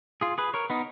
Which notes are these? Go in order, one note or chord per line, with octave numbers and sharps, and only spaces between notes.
F4 G#4
G#4 B4
A#4 C#5
B3 D#4